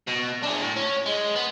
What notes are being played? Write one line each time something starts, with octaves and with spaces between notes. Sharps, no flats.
B2
D4 G#4
A2
C#4
G#3
B3